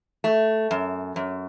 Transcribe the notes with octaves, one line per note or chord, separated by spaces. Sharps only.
A3
F#2
F#2